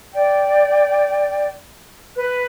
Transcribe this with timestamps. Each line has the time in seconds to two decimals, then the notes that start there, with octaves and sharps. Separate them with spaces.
0.13 D5 G5
2.15 B4 F#6